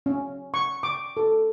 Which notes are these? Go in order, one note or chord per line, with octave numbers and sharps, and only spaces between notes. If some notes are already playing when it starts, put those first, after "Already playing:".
C#4
C#6
D6
A4